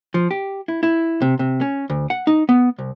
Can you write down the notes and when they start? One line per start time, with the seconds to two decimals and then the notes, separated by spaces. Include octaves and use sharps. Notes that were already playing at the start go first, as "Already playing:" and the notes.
0.14 F3
0.31 G4
0.68 E4
0.83 E4
1.22 C3
1.39 C3
1.61 C#4
1.90 D2
2.10 F#5
2.27 D#4
2.49 B3
2.78 C2